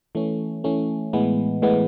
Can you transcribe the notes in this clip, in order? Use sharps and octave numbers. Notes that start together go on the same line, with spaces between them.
E3 A3 C#4
E3 A3 C#4
A2 E3 G#3 B3
A2 E3 G#3 B3